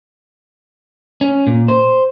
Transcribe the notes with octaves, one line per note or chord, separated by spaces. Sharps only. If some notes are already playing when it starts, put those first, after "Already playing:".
C#4
A#2
C5